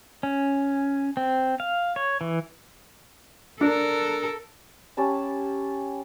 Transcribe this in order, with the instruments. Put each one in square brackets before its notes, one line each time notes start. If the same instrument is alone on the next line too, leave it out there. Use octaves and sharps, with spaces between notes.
[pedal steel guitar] C#4
C4
F5
C#5
E3
[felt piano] D4 [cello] A4 A#4
[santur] C#4 G4 A5 B5